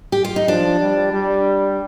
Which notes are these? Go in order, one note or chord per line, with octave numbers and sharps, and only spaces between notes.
G4
F4
D#4
F3 D4
G3
G3